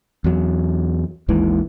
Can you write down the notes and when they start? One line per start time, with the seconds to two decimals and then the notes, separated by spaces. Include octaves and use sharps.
0.24 E2 F#3
1.28 G#1 D#2 G#2 E3